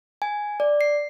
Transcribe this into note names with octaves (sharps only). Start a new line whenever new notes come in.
G#5
D5
C7